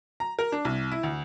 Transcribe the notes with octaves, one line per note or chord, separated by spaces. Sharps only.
A#5
A#4
D4
C2
E4
D2